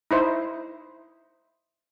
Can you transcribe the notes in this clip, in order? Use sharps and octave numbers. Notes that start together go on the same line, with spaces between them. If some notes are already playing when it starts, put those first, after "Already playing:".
D#4 E4 C5